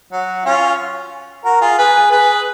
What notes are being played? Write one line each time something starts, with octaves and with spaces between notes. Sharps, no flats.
F#3
C#4 F4
F#4 A#4
F4 G#4
G#4 B4
G#4 B4